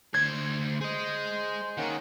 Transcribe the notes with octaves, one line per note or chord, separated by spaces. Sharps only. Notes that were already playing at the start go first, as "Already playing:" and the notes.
D2 C5 G#6
G#4 C5 D#5
D#3 A#3 C#4 F#5